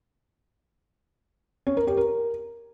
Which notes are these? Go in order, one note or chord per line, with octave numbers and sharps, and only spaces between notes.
C#4
A#4
G4
A#4